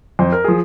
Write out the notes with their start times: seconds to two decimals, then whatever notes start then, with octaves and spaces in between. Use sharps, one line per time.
0.19 F2 C5
0.32 A#4
0.44 F3 G#4